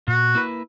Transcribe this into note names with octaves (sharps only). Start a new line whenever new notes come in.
A#2 F#4
A#3 E4 B4